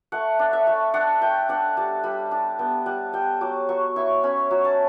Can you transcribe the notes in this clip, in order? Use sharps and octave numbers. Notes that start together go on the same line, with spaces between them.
A3 F#5
D4
E5
A3
D4 F#5
A3 G5
D4 F#5
G3 A5
G3 B5
D4 A5
B3 G5
G3 F#5
G3 G5
F#3 D6
F#3 C#6
E4 C#6
C#4 B5
F#3
A5